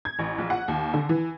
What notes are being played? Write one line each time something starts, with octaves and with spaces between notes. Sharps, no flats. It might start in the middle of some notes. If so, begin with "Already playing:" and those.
G#6
A1
A#1
F#5
D#2
D3
E3